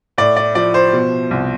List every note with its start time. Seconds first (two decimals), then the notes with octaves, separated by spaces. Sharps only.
0.18 A2 D5
0.36 D5
0.55 F3 D5
0.74 C5
0.93 B2
1.31 C2